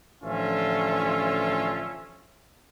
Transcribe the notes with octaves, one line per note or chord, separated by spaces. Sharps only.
A1 D3 F3 C#4 F4 E5